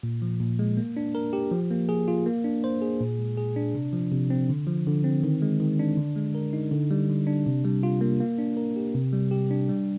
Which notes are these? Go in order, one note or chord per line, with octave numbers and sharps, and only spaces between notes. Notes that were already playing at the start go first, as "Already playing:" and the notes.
A#2
F3
A#2
G#3
A#3
D4
A#4
G4
F3
A#3
G#4
F4
A#3
D4
C5
G#4
A#2
G#3
G#4
D4
C3
F3
C3
C4
D3
F3
D3
C4
D#3
G#3
D#3
D4
D3
G#3
A#4
D#4
D3
G3
D3
D4
C3
G3
F4
A#3
A#3
D4
A#4
G4
C3
G3
G4
D4
G3